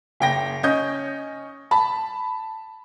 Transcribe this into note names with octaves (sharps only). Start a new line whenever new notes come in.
F#1 G5 A#6
C#4 D#5 G6
A5 B5